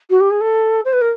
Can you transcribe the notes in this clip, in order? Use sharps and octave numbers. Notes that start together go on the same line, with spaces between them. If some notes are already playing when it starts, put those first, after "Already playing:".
F#4
G4
G#4
A4
C5
B4
A#4